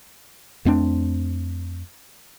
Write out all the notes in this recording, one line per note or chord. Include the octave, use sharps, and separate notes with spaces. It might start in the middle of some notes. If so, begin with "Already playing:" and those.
F2 A3 C4 D4